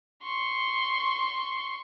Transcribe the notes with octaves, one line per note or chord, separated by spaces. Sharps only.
C6 C#6